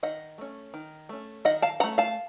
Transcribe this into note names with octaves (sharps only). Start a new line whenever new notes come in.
D#3 D#5 F#5
A3 C#4
D#3
A3 C#4
D#3 D#5 F#5
F5 A5
A3 C#4 F#5 A#5
F5 A5